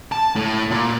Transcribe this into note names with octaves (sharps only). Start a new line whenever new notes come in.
A5
A2
A#2